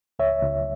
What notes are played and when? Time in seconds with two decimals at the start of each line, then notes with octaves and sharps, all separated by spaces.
0.19 C#2 C#5 E5
0.41 C#2